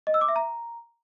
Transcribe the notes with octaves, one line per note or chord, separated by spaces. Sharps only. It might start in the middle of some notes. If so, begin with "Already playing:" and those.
D#5
E6
D6
E5
A#5